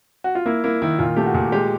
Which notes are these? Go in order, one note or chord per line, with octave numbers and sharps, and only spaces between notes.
F#4
F4
A#3 E4
A#3 E4
D#3 E4
A#2 F4
A3 G4
F#4
A#2
G#3 G4